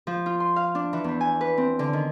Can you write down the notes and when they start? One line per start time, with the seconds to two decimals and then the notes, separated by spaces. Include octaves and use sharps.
0.07 F3
0.26 F4
0.40 C6
0.56 F5
0.75 D4
0.93 E3
1.04 E2
1.21 G#5
1.41 B4
1.57 C4
1.79 D3
1.93 D#3